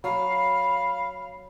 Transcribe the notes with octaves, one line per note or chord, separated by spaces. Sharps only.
F#3 F5 B5